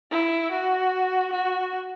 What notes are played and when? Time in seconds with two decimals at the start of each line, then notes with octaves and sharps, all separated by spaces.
0.10 E4
0.51 F#4
1.32 F#4